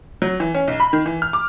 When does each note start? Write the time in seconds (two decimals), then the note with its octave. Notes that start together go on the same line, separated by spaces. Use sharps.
0.22 F#3
0.40 E3
0.54 C#4
0.68 B1
0.80 B5
0.93 D#3
1.06 E3
1.22 F6
1.33 D6